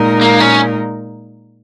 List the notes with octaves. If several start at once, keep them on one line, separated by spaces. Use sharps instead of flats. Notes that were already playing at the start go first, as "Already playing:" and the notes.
Already playing: A#2 G#3 D#4 A#4
A#3
C#4